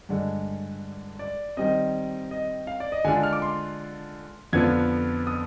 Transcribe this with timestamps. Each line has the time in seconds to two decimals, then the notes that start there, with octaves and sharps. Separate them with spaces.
0.09 G2 D3 G#3
1.19 D5
1.57 D#3 G3 C4 D#5
2.31 D#5
2.67 F5
2.80 D5
2.92 D#5
3.05 D3 G#3 D4 F4 G#5
3.23 F6
3.33 D6
3.42 C6
4.53 F2 D3 F3 B3 F4 G#6
5.27 D#6